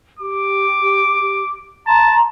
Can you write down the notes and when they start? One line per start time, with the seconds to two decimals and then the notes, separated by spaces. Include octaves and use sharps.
0.19 G4 D6
1.87 A5 A#5 C6